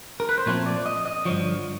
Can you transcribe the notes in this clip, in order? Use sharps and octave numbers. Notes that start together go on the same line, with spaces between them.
A#4
B4
C5
A#2 F3 A3 C4 C#5
D5
D#5
D#5
G2 D3 F3 C#5